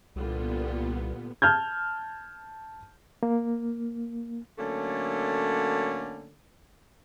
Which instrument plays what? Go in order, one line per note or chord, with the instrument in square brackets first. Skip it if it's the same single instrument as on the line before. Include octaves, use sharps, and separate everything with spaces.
[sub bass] C2 [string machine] A#2 B3 [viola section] D3 G3 F4
[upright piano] A5 F6 G6 G#6
[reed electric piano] A#3
[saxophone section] D3 F#3 A3 A#3 C#4